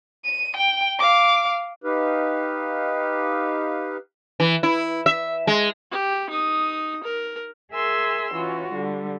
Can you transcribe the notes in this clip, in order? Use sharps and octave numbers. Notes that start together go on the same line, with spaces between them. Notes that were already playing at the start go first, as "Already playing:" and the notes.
D#7
G5
F5 D6
D#4 G4 B4 F5
E3
E4
E5
G#3
G4
D#4 D#6
A#4
G#4 A#4 E5 G#5 C6 E6
E3 C#4 F4 F#4
D3 G3